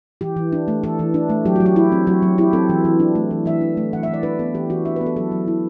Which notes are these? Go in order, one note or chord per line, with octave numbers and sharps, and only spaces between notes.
E3 G4
E3
D4
A3
E3 A4
E3
D4
A3
F#3 G4
F#4
F#3
G4
E4 G4
C4
F#3 F#4
F#3
E4 G4
C4 A4
E3
E3
D4
A3
E3
E3 E5
D4
A3
E3 F#5
E5
E3
D5
D4 B4
B3 A4
E3 G4
E3 F#4
D4 E5
B4
B3
A4
F#3 A4
F#3
E4